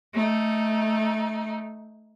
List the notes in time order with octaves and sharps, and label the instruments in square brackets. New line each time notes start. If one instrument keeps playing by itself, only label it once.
[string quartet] A3 D#4